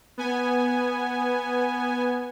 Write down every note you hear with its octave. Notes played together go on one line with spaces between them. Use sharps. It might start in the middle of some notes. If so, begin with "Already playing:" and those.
B3 G#5